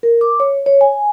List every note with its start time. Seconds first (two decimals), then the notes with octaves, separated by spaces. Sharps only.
0.03 A#4
0.21 D6
0.40 C#5
0.66 C#5
0.81 G#5